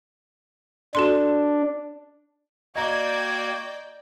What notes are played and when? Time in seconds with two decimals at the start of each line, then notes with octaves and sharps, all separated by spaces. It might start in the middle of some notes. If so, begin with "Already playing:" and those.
0.95 D4 F#4 A4 C6
2.76 A#3 F#4 D5 D#5 G5 A#5 G#6